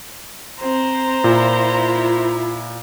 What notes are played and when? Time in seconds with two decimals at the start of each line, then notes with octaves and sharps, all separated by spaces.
0.61 C4 C5 A#5
1.24 A#2 E4 F4